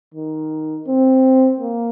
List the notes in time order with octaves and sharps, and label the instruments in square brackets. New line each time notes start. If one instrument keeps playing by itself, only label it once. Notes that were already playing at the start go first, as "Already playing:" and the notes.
[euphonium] D#3
C4
A#3